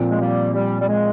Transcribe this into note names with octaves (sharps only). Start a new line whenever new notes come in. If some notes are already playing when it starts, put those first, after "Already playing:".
Already playing: A#2 F3 C4
G#3
G3 A#3
G3
G3
G#3